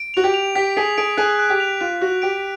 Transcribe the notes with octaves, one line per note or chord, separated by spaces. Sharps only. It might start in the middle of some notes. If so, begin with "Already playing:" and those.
Already playing: D7
F#4 F7
G4
F7
G4 B6
G#4 B6
G#4 D7
G#4 F#6
F#6
G4
F7
F4 F#6
F#4 F#6
G4 D7